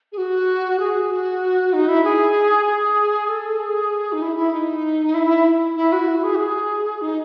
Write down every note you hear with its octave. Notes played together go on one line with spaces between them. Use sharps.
G#4
F#4
G#4
F#4
D#4
E4
G#4
G#4
A4
G#4
D#4
E4
E4
D#4
E4
E4
F#4
E4
G#4
F#4
G#4
D#4